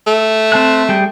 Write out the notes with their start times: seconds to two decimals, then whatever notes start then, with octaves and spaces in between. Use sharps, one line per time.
0.07 A3
0.52 C4 A5 F#6
0.89 G3 G#4 G5